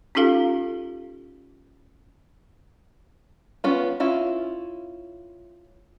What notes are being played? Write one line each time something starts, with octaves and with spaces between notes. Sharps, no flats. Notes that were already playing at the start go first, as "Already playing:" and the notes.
C#4 D#4 F4 G4 A4 F5
B3 C#4 F4
C#4 E4 F4